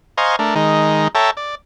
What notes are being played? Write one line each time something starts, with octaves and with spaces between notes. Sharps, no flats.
C5 D#5 F5 G#5 A#5 C#6
A3 D4 A#4
D#3 G#3 D#4
A4 C#5 E5 G5 A5 A#5
D5